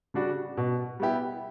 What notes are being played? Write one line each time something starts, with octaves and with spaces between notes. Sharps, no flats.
C#3 G3 D4 F#4
B2
G3 B3 E4 G4